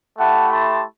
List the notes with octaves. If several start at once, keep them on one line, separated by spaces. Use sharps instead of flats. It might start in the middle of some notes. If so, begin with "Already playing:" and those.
A3 E4 G4 F#5 A5
A5 C6